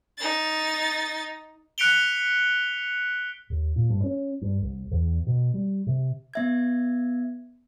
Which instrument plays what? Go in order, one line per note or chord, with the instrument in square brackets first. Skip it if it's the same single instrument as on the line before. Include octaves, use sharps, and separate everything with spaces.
[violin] D#4 A6
[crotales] F#6 B6 C#7 D7 F7 G7
[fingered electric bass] D#2
A#2
G2
C#4
G2
C2
E2
B2
G3
C3
[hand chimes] B3 E5 G#6